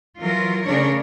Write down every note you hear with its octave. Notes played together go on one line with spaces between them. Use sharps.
E3 F#3 F4 A#4
C#3 A3 D4 A#4 C#5